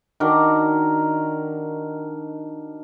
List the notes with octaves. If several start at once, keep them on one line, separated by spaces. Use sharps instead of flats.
D#3 D4 F#4 A#4